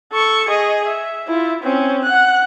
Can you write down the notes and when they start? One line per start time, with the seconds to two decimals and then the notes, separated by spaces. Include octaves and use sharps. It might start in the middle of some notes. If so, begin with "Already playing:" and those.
0.13 A4 C#6
0.49 G#4 D#5
0.87 E5
1.28 E4 F4
1.64 C4 C#4
2.05 F#5 F#6